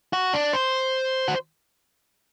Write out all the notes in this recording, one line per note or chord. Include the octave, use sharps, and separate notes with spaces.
F#4
D4
C5
F#4